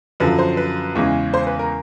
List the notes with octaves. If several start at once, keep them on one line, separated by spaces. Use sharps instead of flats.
F#2 D3 F3 B4
C5
B4
E2 C#3 E3 G#3
C5
B4
A#4